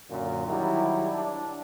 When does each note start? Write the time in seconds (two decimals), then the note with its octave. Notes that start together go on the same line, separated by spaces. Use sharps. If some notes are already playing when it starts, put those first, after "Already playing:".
0.10 F#2 A#2 D3
0.47 D#3 F#3 G3 E4
1.13 D4